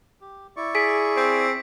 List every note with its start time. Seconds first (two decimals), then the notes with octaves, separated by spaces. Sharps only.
0.21 G4
0.57 E4 D5 C#6
0.75 G#4 B6 D7
1.17 C4